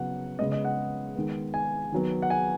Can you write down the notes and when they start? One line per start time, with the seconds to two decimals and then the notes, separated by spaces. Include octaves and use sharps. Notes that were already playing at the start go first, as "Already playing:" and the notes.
Already playing: C#3 F#3 B3 F#5
0.39 C#3 G#3 B3 D#5
0.52 D#5
0.65 F#5
1.16 D#3 G#3 B3
1.54 G#5
1.92 D#3 F#3 B3
2.22 F#5
2.30 G#5